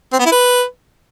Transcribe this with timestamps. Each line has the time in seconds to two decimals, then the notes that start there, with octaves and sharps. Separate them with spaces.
0.13 C4
0.19 B3
0.26 E4
0.32 B4